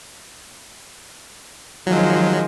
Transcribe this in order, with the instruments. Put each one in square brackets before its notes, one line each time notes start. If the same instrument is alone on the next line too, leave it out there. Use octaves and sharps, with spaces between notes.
[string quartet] D#3 F3 G#3 [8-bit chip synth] F#3